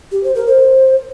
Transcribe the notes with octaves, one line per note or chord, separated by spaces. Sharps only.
G4
C5
A#4
C5